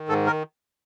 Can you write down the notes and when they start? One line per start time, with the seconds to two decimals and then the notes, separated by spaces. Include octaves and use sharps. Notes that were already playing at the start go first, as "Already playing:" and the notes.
Already playing: D#3
0.08 G#2 A4
0.26 A#4